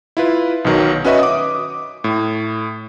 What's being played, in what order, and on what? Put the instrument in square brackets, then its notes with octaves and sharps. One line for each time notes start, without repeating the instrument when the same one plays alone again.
[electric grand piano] E4 F4 B4
B1 B2 D#3 F#3
C#4 F#4 B4 D#5 E5 C#6
D6 D#6
A2